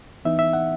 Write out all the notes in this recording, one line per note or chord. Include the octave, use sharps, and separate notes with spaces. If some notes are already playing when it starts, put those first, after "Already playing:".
E3 B3 D#4 E5
E5
F#5